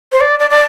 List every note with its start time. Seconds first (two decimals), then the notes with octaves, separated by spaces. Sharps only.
0.12 C5
0.21 D5
0.39 D5
0.50 D5